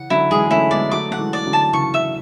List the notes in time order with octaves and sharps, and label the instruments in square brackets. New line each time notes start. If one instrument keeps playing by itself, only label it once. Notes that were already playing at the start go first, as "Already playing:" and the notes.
Already playing: [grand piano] C#3 E3 [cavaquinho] F#5
[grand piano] D3 F#3 [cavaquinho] E4
[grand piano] E3 G#3 [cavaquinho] G#4
[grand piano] A3 C#4 [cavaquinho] E4
[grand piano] G#3 B3 [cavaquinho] D5
[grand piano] F#3 A3 [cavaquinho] D6
[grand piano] A3 [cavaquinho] F#5
[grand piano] E3 G#3
[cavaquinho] D5
[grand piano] D3 F#3
[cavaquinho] A5
[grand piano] C#3 E3 [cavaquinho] C#6
[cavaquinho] E5